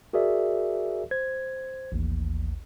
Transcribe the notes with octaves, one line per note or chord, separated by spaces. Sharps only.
F#4 G#4 A#4 D5 E5
C5 G#6
A1 D#2